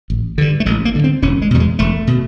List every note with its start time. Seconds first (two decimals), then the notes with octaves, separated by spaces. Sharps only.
0.10 A1
0.38 G2 D3
0.60 A3
0.66 A1 G#3
0.85 A#3
0.94 G2 D3
1.04 C4
1.22 E1 C#4
1.42 G#3
1.51 E2 B2 G3
1.60 G#3
1.79 E1 A3
2.07 B2